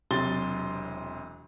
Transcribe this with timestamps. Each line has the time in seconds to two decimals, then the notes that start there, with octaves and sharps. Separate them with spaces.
0.11 E1 C3 F#3 C6 A6 G7